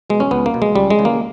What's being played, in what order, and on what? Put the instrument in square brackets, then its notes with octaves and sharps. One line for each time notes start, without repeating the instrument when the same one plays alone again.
[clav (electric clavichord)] B2 G#3
C#4
C#2 B3
A#3
B2
G#3
C#2 G3
G#3
C#3 E3
A#3